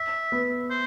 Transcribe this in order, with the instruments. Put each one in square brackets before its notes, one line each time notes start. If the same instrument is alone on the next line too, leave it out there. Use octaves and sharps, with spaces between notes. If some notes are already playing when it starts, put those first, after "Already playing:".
Already playing: [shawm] E5
[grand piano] B3
[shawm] C5